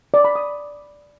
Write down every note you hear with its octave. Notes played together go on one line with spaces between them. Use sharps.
D5
B5
D#6